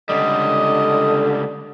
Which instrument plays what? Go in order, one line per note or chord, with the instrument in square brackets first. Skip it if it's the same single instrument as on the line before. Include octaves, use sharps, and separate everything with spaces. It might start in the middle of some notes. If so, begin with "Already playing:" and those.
[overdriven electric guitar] C#2 G3 [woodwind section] D3 [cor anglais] D#5